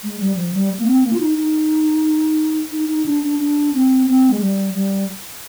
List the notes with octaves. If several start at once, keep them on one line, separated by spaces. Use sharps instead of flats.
G#3
G3
F3
G3
A#3
C4
A#3
F4
D#4
D#4
D#4
D#4
D4
D4
D4
C4
C4
G#3
G3
G3